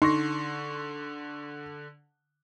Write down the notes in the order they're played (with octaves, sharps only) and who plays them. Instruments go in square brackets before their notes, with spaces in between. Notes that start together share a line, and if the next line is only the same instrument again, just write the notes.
[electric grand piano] D3 [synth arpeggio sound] D#4 [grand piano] C6 C#6 A#6